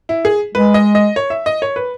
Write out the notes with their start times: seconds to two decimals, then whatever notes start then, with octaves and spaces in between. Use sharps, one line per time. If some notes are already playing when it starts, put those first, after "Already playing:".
0.09 E4
0.25 G#4
0.55 G#3 B4
0.74 D#5
0.95 D#5
1.16 C#5
1.30 E5
1.46 D#5
1.62 C#5
1.76 B4